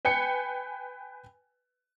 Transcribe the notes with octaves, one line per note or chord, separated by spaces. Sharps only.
B4 G5 G#5 C#7